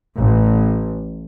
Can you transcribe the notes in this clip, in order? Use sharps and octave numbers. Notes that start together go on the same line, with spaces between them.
A1